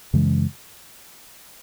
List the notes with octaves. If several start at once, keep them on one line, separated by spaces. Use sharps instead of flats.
F#2 C#3 E3 G#3